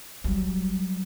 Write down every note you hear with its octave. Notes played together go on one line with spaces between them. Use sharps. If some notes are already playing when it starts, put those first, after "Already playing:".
F#3 G3